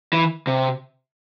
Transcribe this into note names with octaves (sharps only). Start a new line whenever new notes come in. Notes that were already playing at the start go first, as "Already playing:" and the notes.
E3
C3